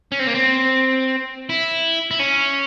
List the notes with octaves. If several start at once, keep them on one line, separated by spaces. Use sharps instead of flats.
C#4
C4
A#3
C4
E4
E4
C#4